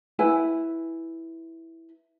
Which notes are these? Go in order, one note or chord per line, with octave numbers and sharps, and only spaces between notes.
E4 B4 G#5